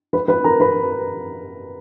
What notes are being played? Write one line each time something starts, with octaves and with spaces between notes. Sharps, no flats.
B4 B5
B4 B5
A#4 A#5
B4 B5